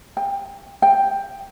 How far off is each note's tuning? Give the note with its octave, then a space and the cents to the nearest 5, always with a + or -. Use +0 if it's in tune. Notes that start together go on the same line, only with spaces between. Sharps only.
G5 +25
G5 +10